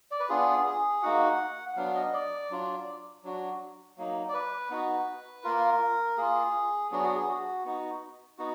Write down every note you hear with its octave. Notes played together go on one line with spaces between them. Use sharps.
D5
B4
B3 D4 F4 G#4
G#4
A#3 D#4 F#4 F#5
F#5
F#3 B3 D4 F5
D#5
D5
F#3 D4 F4
F#3 D4 F#4
F#3 A#3 D#4
D5
B4
B3 D#4 F#4
A#3 F4 A#4
A#3 F4 G#4
F#3 B3 D4 F#4 G#4
F#4
G#4
F#4
B3 D#4 F#4
B3 D#4 F#4